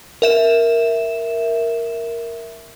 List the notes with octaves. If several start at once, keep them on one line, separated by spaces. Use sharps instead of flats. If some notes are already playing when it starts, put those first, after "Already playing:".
A#4 E5 E7